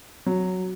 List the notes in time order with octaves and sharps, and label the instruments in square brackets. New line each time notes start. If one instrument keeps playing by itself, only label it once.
[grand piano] F#3